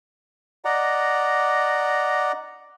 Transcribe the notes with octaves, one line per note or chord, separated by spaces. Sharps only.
D5 D#5 F#5 A#5